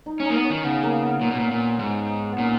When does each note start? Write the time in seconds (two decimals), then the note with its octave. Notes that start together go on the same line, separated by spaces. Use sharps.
0.06 D#4
0.20 C#4
0.25 D#4
0.30 A#3
0.35 B3
0.44 C#4
0.50 D#3
0.63 C#3 B3
0.83 A#3
1.02 B3
1.21 A#2
1.31 B2
1.40 A#2
1.51 A#2
1.79 G#2
2.32 B3
2.37 A#2 C#4